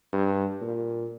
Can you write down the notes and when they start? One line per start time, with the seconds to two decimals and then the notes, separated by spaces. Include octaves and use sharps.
0.13 G2
0.61 A#2